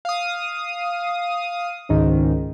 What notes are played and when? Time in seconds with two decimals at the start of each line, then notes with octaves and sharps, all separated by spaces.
0.05 F5 D#6
1.89 C#2 G#2 D#3